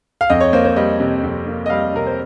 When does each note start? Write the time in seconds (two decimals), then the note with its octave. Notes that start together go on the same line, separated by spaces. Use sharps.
0.21 F5
0.30 F2 D#5
0.41 C#5
0.53 A#3 C5
0.65 C5
0.76 G3 D#5
1.00 C3
1.23 F2
1.46 A#3
1.66 D#5
1.70 G3 F5
1.93 C3 A#4
2.07 C5